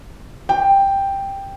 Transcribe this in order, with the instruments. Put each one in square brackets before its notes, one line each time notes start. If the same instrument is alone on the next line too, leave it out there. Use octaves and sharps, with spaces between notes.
[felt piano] G5